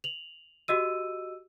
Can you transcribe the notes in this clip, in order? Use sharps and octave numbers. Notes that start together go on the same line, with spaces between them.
F7 F#7
F#4 G4 D#5 E6 D#7